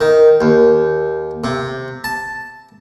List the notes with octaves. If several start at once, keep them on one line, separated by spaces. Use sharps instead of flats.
D#3
D#2
C3
A5